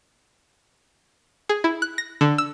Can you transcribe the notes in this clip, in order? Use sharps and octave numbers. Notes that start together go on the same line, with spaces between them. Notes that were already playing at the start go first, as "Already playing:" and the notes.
G#4
E4
F#6
A#6
D3
E6